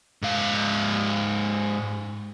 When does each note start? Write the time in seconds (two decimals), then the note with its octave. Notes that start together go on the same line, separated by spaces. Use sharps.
0.22 G#2 F5